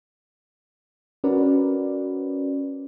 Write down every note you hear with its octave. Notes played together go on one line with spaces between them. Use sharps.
C#4 F#4 A#4 B4 D5